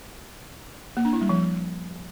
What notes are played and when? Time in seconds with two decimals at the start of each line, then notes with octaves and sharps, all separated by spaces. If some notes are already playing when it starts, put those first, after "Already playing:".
0.97 A#3
1.05 D4
1.13 E4
1.21 G3
1.29 F3